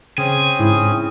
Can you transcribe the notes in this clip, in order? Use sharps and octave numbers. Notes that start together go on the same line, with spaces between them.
C#3 C4 C#4 G#4 G#5
G#2 E4 D#6